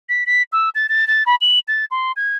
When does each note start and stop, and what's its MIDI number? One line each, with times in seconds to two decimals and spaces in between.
0.09 0.24 95
0.26 0.43 95
0.52 0.69 88
0.75 0.87 93
0.89 1.07 93
1.08 1.23 93
1.26 1.35 83
1.41 1.59 102
1.68 1.85 93
1.91 2.12 84
2.16 2.37 92